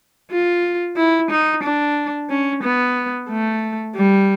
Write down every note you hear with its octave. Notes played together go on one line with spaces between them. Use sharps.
F4
E4
D#4
D4
C#4
B3
A3
G3